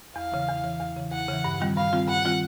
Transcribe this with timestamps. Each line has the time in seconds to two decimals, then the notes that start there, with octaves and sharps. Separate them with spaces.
0.16 E2 F5
0.32 C#3 E3
0.48 E2
0.64 C#3 E3
0.80 E2
0.97 C#3 E3
1.12 E2 F#5
1.28 C#3 E3
1.44 G2
1.60 D#3 G3 C4 F4
1.77 G2 F5
1.93 D#3 G3 C4 F4
2.08 G2 F#5
2.25 D#3 G3 C4 F4